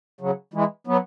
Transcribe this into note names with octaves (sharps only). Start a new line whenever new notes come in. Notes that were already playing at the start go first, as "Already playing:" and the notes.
C#3 F#3
E3 G#3
F#3 B3